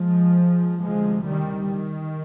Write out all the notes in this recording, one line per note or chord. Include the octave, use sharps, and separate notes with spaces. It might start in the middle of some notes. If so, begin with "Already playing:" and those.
Already playing: F3 G#3
D2 C3 F3 G#3
D#3 G3
D#3